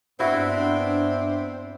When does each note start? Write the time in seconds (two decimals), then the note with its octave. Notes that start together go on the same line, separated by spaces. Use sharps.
0.20 G2 B3 C4 D4 E4 F#4 E5